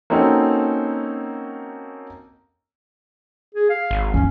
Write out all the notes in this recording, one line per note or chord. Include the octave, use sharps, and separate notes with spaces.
A#3 C4 C#4 D#4 F#4 A4
G#4
F5
G#1
F#1 D3 C#4